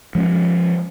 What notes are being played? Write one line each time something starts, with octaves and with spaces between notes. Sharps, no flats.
F3 G#3 A3 C#4